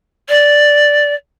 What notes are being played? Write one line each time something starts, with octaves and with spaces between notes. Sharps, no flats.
D5